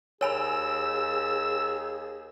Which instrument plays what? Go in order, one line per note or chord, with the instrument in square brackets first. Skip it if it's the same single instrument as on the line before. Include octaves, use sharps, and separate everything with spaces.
[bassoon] D#2 [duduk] G#4 [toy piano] C#5 G#5 B5 [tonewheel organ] E6